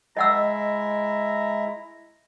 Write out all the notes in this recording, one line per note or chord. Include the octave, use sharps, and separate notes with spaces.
G#3 E4 D#5 E5 F#5 A#5 E6